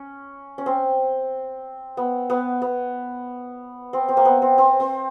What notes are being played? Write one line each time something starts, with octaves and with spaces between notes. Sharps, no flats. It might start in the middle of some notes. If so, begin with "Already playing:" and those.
Already playing: C#4
C#4
C4
B3
B3
B3
C4
C4
A#3
B3
C4
C4
C4